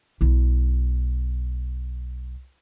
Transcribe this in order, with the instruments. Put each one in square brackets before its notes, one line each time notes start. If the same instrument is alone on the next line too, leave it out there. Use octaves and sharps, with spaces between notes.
[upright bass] B1 E4